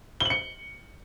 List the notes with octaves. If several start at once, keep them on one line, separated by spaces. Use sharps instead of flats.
C#7 F#7 G7